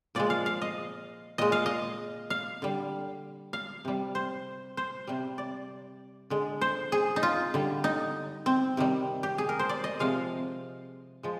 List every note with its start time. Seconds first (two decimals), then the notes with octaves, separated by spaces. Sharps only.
0.15 A#2 F3 G#3 D5
0.30 F5
0.46 F5
0.62 D#5
1.38 A#2 G#3 D#5
1.52 F5
1.66 D#5
2.30 F5
2.62 D3 G3
3.53 F5
3.85 C3 G3
4.15 C5
4.77 C5
5.07 C3 G3
5.38 D5
6.30 D3 G#3
6.61 C5
6.92 G#4
7.16 D#4
7.23 F4
7.54 D3 G3
7.84 D#4
8.46 C4
8.77 C3 D#3 G3
9.23 G4
9.38 G#4
9.49 A#4
9.59 C5
9.69 D5
9.84 D#5
9.99 C3 F3 G#3 F5
11.23 F3 G#3